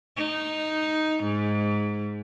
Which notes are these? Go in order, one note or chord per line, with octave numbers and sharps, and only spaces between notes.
D#4
G#2